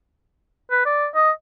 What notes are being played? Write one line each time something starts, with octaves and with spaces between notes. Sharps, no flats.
B4
D5
D#5